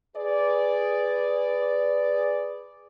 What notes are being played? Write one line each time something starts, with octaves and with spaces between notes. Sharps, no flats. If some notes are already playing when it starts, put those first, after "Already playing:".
G#4 B4 D5